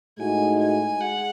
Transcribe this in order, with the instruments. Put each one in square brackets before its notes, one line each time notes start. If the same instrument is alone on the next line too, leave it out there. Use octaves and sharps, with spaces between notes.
[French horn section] A2 G#3 D#4 F#4 [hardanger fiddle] G#5
[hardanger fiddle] G#5
[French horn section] G#3 [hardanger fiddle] F#5